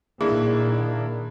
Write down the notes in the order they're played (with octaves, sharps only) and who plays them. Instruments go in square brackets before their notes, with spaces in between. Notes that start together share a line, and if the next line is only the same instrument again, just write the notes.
[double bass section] A#2 D#3 [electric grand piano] A#3 D4 E4 [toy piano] G#4